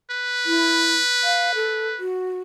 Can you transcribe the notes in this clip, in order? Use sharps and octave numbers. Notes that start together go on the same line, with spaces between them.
B4
E4
F5
A4
F#4